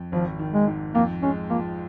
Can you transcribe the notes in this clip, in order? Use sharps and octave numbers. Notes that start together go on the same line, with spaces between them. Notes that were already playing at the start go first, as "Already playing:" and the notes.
Already playing: F2
G#1 F3
D#3
G#3
G#2
F2 A#3
G#3 C#4
F3 A#3